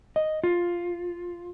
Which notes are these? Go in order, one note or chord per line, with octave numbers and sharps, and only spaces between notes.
D#5
F4